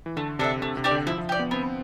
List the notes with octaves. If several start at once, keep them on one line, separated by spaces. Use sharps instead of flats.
E3
D3 A3
C3 D4 A4 E5
C3 A3
C3
D4 G4 D5
D3
F3 E4
F3
G4 D5
B3
B3 C4